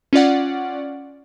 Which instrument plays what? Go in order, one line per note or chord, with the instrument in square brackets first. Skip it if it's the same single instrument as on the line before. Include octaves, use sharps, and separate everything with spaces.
[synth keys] C#4 F4 D5 F#5